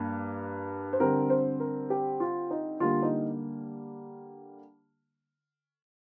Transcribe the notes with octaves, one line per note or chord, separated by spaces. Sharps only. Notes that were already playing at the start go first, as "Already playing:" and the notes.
Already playing: G2 A#3
C5
D3 G3 C4 A#4
C5
A#4
G4
F4
D#4
D3 G3 A#3 F4
D#4